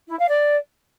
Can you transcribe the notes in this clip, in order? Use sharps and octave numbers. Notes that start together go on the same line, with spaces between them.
E4
F5
D5